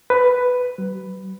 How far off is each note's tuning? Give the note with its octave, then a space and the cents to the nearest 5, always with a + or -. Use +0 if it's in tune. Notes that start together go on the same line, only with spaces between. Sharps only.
B4 +10
F#3 +40